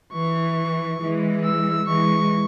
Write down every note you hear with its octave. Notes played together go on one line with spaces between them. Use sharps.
E3 C#6
E3 G#3
E6
E3 G#3 C#6